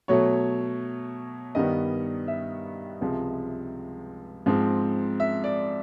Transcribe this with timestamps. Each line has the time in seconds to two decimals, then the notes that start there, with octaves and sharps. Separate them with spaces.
0.08 B2 F#3 A3 C#5
1.55 G2 D#3 G3 B3 D#5
2.28 E5
3.01 C#2 C3 F3 G#3
4.46 G#2 F3 G#3 C4
5.20 E5
5.44 D5